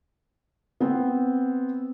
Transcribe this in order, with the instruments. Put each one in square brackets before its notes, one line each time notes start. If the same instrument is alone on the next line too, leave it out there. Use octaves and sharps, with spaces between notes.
[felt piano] B3 C4